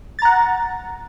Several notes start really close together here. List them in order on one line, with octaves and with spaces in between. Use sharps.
A6 A#5 F#5